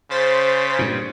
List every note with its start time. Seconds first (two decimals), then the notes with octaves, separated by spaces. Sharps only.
0.10 C#3 C5 A6 B6
0.79 G2 A#2